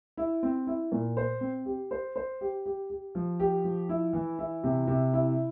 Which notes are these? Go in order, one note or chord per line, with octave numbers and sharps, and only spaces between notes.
E4
C4
E4
A#2
C5
C4
G4
C5
C5
G4
G4
G4
F3
G4
F3
E4
E3
E4
C3
C3
E4